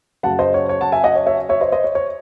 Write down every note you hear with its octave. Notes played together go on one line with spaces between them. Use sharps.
F#2 C#3 F#3 F#5 A5
C5 D#5
C#5
C#5
F#5 A5
E5 G#5
D#5 F#5
C#5
C#5 E5
C#5 E5
C5 D#5
C5 D#5
C#5
C#5